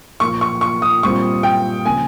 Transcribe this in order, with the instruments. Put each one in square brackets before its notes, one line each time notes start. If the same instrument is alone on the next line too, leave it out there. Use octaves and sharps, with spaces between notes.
[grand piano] A#2 F3 A#3 [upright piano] C#6
[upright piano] C#6
C#6
D#6
[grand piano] A#2 G3 C4 F4 [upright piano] C#6
[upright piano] G5
[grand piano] C#3 F3 A#3 [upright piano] G#5